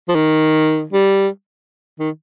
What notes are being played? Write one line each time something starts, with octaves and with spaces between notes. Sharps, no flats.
F3
D#3
G3
D#3